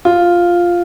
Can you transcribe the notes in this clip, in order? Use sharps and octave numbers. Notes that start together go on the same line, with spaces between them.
F4